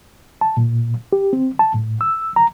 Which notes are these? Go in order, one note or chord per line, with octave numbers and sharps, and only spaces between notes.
A5
A#2
G4
C4
A5
A2
E6
A#5